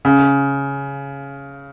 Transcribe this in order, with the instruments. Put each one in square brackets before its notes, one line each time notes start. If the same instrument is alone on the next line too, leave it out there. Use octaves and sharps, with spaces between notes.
[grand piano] C#3